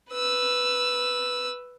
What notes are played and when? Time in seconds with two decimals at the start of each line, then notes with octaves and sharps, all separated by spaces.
0.11 B4 E6